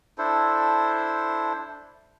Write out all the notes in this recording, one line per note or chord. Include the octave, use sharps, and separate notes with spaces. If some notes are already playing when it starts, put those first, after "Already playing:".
D4 E4 A4 C5